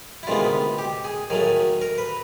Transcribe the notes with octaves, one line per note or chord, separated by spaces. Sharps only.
E4
D2 C3 D#3 G#3 B3 F4
G4
G#4
D#2 D#3 F#3 A3 G#4
A#4
B4